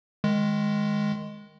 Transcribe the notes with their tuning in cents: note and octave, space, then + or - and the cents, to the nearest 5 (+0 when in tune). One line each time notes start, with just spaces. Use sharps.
D#3 -5 G#3 +0